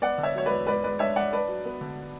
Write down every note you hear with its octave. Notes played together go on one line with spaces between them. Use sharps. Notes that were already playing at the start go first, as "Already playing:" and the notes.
B3 D5 F#5
D3
C#5 E5
F#3 C#5
E2 B4 D5
G#2 B4 D5
G#3 B4 D5
D4 C#5 E5
G#2 D5 F#5
D4 B4 D5
F#3
B3
D3